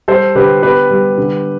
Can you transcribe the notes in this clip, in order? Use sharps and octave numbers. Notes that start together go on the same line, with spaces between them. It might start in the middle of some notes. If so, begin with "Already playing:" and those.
G3 A4 C5
D3 G4 B4
B3 G4 B4
G3
D3